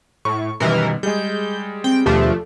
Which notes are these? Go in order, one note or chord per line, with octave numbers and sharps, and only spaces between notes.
A2 C#6
F#2 B2 D#3 E3 G3 A#4 D#5
G3 G#3 G#4 D#5 G6
C4 G5
D#2 B2 F3 A3 D4 G4 A4